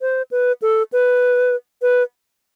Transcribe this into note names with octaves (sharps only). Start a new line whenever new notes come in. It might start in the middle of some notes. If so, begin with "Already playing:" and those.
C5
B4
A4
B4
B4